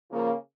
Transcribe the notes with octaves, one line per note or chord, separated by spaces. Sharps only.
C#3 F3 A#3